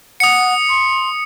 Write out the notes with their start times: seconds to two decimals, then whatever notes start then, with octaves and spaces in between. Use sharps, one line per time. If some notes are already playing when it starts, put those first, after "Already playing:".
0.20 F#5 D#6 C#7
0.69 C6